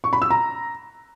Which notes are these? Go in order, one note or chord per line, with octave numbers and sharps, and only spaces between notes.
C#6
B5
E6
A#5